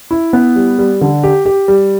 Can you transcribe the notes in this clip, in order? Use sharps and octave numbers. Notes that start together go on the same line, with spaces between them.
E4
B3
G3
G3
D3
G4
G4
G3